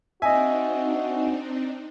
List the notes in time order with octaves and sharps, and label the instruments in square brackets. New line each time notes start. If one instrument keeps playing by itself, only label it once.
[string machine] C4 D4 D#4 [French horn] F#4 [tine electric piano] D#5 E5 [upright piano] G#5